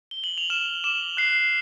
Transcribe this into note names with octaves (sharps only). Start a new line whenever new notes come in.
G7
F#7
F7
F6 E7
D6 E7
F#6 C7